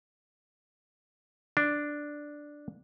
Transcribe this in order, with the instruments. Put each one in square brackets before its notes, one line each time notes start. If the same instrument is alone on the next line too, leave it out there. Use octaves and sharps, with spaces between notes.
[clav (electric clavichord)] D4